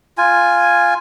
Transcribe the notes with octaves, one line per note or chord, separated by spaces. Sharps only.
F4 G#5